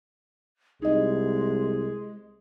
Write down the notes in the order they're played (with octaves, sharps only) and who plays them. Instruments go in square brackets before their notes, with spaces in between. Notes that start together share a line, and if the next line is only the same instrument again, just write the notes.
[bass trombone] C2 [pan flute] G#3 [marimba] D#4 D#5 [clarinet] G#4